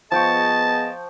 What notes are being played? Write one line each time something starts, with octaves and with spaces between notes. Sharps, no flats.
F3 B3 G#4 D#5 G5 A5 C#6